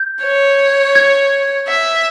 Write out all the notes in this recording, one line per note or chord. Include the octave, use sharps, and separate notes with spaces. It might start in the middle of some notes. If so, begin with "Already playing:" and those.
Already playing: G6
C#5
G#6
E5